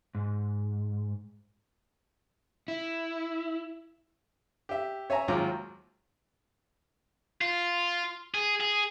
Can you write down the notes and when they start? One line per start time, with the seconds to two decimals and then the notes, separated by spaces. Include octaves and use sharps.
0.15 G#2
2.68 E4
4.69 G4 E5
5.10 C#5 E5 G#5 A#5
5.28 D#2 G#2 F#3 F4 A#5 D6
7.41 F4
8.34 G#4
8.60 G#4